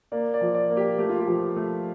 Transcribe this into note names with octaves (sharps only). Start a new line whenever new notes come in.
A#3 D5
D5
F3
D5
A#3
G4
A3 G4
F4
G4
F3
A3